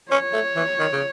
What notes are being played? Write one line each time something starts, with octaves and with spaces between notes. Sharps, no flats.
C#4 C#5
A3
E3
D#3
C#3